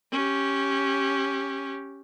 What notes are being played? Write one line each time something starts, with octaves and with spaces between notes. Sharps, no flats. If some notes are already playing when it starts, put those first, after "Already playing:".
C#4 G4